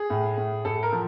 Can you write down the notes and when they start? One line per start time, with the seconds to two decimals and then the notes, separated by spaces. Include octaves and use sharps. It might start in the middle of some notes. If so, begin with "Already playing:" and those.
Already playing: G#4
0.10 A2
0.37 A2
0.65 A2 A4
0.83 A#4
0.92 F3